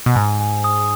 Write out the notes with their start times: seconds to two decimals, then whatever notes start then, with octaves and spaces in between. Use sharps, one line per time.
0.06 B2
0.15 G#2 G#5
0.41 G#5
0.64 D#6